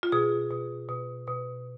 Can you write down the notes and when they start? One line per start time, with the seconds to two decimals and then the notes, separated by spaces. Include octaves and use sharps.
0.03 F4
0.12 B2 G#4
0.51 B2
0.89 B2
1.27 B2